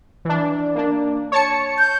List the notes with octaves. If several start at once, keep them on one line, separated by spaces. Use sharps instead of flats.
E3 D4
A#3 D4
C#5 A5 C#7
G6